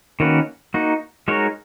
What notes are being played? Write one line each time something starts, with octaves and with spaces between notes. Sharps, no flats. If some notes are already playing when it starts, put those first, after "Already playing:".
D#3 A#3 C#4 F#4 B4
A#3 D#4 F#4
G#3 D#4 F#4 A#4 C#5